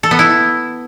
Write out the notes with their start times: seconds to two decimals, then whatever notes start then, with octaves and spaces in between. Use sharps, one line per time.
0.03 A4
0.11 B3
0.19 E4